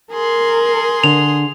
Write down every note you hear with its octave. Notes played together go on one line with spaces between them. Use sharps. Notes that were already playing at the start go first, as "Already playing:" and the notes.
G#4 A#4 C6
D3 F7